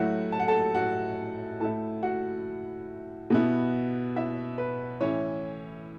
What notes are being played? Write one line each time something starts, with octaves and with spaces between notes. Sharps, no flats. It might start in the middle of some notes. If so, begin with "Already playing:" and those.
Already playing: A2 F#3 A3 E4 F#4 F#5
A5
F#5
A4 A5
F#4 F#5
A2 A3 E4 A4 A5
F#4 F#5
B2 B3 E4
E4 E5
B4
A2 E3 C#4 E4 C#5